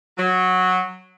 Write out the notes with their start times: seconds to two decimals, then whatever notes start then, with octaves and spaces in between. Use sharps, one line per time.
0.18 F#3